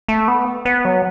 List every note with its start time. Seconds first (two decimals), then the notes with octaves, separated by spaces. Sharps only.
0.08 A3
0.28 B3
0.65 B3
0.85 F#3